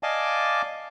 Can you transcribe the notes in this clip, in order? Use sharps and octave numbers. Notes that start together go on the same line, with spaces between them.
D5 D#5 F5 G#5 A5 D6